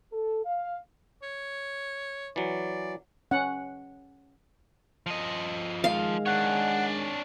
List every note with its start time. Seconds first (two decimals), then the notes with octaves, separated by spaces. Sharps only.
0.12 A4
0.45 F5
1.22 C#5
2.36 E3 F#3 D5
3.31 C#4 F#5
5.06 F3 D#5
5.84 D#3 G#3 F5
6.26 D4 C#5 F#5